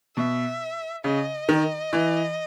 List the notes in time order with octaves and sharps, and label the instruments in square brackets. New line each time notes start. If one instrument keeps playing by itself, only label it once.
[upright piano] B2 [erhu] E5
[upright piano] C#3 [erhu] D#5
[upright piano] D#3
E3